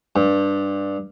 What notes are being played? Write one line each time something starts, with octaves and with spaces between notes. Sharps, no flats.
G2